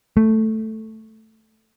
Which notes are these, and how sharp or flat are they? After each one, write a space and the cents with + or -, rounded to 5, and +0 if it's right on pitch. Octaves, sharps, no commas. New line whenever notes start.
A3 +0